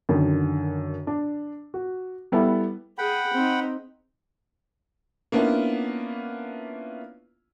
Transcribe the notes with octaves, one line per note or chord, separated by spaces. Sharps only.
F#2 D3 D#3
D4
F#4
G3 B3 E4 A4
G#4 F#5 G5 B5
C4 D#4
A#3 B3 C#4 D4 E4 F4